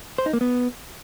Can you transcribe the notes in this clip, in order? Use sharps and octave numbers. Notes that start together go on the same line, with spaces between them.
C5
D#4
A#3
B3